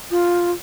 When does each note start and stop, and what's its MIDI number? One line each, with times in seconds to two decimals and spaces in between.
0.11 0.51 65